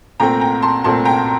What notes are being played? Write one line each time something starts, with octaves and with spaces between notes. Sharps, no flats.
C2 A#2 A3 C4 G5 A#5
G5 A#5
A5 C6
C2 A#2 A3 C4 A5 C6
G5 A#5